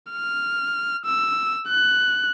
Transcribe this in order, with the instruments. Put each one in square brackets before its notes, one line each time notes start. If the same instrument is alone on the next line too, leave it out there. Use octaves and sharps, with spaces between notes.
[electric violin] F6
E6
F#6